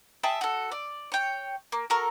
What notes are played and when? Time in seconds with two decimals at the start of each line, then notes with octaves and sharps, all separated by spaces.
0.23 G#4 E5 G5 A5
0.41 F#4 A4
0.72 D5
1.12 C#5 G5
1.72 A#3
1.90 F#4 A4 A#4 C#6